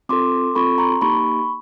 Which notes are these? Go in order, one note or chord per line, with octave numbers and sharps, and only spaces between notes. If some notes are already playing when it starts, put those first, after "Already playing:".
C4 F4 A4 C6 D6
C4 F4 A4 B5 C#6
A#5 C6
A#3 D#4 G4 B5 C#6